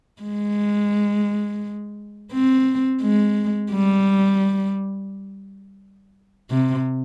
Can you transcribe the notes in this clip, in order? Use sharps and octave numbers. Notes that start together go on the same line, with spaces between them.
G#3
C4
G#3
G3
C3